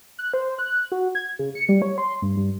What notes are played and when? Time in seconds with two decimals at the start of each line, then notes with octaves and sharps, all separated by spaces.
0.19 F#6
0.34 C5
0.59 F#6
0.92 F#4
1.15 G#6
1.39 C#3
1.55 C#7
1.69 G3
1.82 C#5
1.98 C6
2.22 G2
2.37 G2